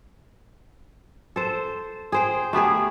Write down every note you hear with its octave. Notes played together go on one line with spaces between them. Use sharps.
A4 C5
G#4 C5 G5
A3 B3 G4 G#4